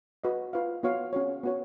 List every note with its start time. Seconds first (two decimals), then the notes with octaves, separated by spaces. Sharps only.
0.24 F#4 B4 D#5
0.53 F4 B4 F5
0.83 B3 F#4 C#5 F5
1.13 C#4 F#4 C#5
1.43 B3 F#4 C#5